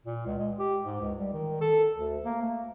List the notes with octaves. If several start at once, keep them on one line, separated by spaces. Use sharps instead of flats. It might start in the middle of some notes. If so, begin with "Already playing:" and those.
A#2
C#2
G#3
G4
G#2
C#2
G3
D#3
A4
D2
A#3
A3